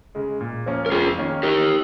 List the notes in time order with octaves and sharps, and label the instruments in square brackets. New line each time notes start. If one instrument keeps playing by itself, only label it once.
[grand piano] C#3 G#3
A#2
F3 A#3 C#4
[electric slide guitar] A#4
[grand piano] F2 [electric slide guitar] F4 G#4
[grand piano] D#3 A#3 C#4
[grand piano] D#3 [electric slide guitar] G4 A#4